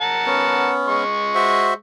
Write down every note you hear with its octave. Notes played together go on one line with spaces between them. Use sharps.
A#4 F#5 A5
B3 C#4
G#3 C#6
F#4 C5 E5